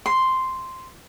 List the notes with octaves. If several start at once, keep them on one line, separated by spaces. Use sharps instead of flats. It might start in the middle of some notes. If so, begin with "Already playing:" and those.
C6